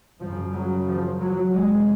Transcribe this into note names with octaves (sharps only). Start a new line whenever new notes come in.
F#2 C#3 F3
F#3
F3
F#3
F2 C3 G#3